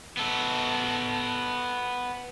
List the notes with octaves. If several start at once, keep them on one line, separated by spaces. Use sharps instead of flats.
B3 A4